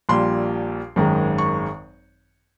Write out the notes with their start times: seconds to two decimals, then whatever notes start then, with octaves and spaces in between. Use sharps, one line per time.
0.09 A#1 A#2 G3 C6
0.96 G#1 F#2 D#3 G#3
1.38 C#6